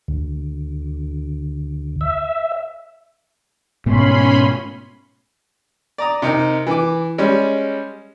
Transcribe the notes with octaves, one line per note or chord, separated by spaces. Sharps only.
D2
E5
G#2 B2 A3 C#4 B5 C6
D5 A#5 D#6
C3 D#4 A#4
E3 D6
G3 G#3 C#4